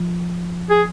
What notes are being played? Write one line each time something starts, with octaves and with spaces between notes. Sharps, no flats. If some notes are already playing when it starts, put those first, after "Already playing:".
Already playing: F3
G#4